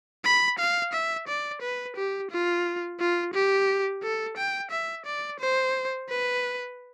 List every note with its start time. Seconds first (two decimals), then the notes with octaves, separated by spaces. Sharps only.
0.25 B5
0.59 F5
0.93 E5
1.28 D5
1.62 B4
1.97 G4
2.31 F4
3.00 F4
3.34 G4
4.03 A4
4.37 G5
4.71 E5
5.06 D5
5.40 C5
6.09 B4